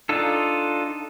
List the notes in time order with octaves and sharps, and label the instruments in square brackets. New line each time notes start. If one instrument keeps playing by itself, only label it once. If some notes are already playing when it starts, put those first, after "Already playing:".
[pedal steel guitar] D4 D#4 F4 A4